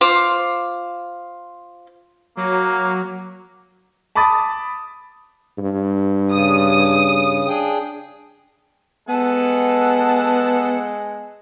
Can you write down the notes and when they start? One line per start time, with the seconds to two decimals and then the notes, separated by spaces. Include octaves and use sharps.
0.01 F4 C5 D6
2.37 F#3 A#3
4.15 A5 B5 D6 D#6 A6
5.58 G2
6.32 C#3 D#6
7.48 D4 G#4 G5
9.09 G#3 B3 A4 F#5 A5